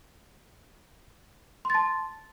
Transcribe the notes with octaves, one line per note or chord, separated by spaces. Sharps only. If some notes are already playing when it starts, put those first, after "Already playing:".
A5 C6 A6